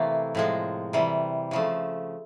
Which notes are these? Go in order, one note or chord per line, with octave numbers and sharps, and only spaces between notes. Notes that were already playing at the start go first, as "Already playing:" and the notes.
Already playing: C3 E3 A3 A#3
A2 F3 G#3
C3 E3 G3
C#3 F3 A3